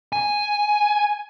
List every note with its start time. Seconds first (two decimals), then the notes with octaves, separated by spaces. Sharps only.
0.12 G#5